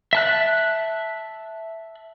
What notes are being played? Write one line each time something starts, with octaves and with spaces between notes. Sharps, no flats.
E5 A5 F#6